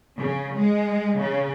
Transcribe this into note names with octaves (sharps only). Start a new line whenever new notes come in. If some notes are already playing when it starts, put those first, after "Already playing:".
C#3
G#3
C#3